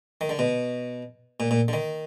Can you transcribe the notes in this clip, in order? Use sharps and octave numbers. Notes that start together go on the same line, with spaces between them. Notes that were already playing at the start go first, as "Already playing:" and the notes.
D#3
D3
B2
A#2
A#2
D3
D#3